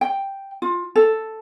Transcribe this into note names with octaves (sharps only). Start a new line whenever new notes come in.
G5
F4
A4